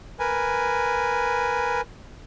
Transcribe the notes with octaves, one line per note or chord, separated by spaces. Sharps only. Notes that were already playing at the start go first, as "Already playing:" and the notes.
A#4 B4 G#5